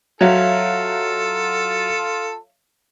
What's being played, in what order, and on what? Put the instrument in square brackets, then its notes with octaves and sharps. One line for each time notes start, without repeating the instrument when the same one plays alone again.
[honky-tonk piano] F#3 [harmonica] F4 A4 [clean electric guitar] C#5 E5 F5